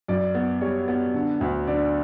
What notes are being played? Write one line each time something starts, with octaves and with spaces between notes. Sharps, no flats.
F#2 D5
B3
G3 C#5
B3
D3
D2
D3 D5